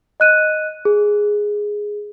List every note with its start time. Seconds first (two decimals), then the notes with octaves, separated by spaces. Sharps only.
0.20 D#5 F#6 D#7
0.85 G#4